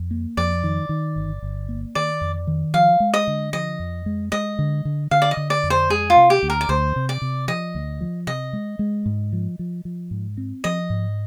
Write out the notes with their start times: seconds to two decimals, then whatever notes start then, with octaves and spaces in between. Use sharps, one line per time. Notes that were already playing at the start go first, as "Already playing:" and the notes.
Already playing: F2
0.11 A#3
0.37 F2 D5
0.63 D#3
0.89 D#3
1.16 G1
1.42 G1
1.69 A#3
1.95 D#3 D5
2.21 F2
2.47 D#3
2.74 F3 F5
3.00 G#3
3.14 D#5
3.27 D3
3.53 F3 D#5
3.79 F2
4.06 G#3
4.32 G#3 D#5
4.59 D3
4.85 D3
5.11 D3 F5
5.22 D5
5.31 D#5
5.37 D3
5.50 D5
5.63 F2
5.70 C5
5.89 G#3 G#4
6.10 F4
6.17 C3
6.30 G4
6.43 D2
6.50 A#4
6.61 D5
6.69 D2 C5
6.96 C3
7.09 D5
7.22 C3
7.48 F3 D#5
7.75 D2
8.01 F3
8.27 C3 D#5
8.53 G#3
8.79 G#3
9.06 G#2
9.33 F3
9.59 F3
9.85 F3
10.11 G#2
10.37 C4
10.64 F3 D#5
10.90 G#2